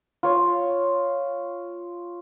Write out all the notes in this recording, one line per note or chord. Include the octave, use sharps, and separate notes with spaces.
F4 C#5